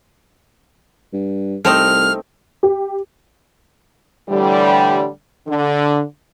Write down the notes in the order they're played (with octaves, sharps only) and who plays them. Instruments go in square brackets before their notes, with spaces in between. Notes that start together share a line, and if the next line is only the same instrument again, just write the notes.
[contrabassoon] G2
[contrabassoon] C2 [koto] A3 C4 D#4 [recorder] F6
[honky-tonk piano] G4
[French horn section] A2 D3 E3 G3
D3